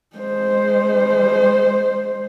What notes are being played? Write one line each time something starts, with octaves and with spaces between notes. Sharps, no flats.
G#3 C5